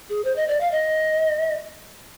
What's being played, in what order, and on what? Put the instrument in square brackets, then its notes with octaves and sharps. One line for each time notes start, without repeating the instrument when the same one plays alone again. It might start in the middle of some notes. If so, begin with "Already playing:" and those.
[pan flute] G#4
C5
D#5
D5
F5
D#5